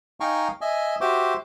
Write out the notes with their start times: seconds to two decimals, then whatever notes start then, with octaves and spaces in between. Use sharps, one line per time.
0.20 D#4 F5 G5 G#5 A#5 C#6
0.61 D#5 E5 G#5
1.01 F#4 G4 C5 E5 C6 D6